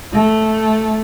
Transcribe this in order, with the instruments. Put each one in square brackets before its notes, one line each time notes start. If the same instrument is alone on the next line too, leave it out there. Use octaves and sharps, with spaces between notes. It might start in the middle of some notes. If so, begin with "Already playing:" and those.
[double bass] A3